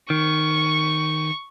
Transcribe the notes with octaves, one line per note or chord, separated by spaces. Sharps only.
D#3 C#6